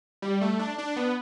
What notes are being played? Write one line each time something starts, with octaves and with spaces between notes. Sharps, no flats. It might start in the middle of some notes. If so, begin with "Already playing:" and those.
G3
A3
D4
D4
B3